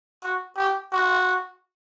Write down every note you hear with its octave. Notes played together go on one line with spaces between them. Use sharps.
F#4
G4
F#4